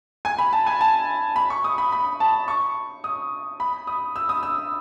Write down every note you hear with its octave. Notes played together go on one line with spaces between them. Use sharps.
G#5
B5
A5
G#5
A5
B5
C#6
D#6
B5
B5
A5
C#6
D#6
B5
D#6
E6
D#6
E6